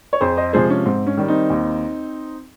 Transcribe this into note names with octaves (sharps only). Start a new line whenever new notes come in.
C#5
F2 G#4 C5
C5 D#5
C3 F3 G#3 G#4 C5
C#4
G#2 C4
C#4
D#3 G3
C4 D#4
D#2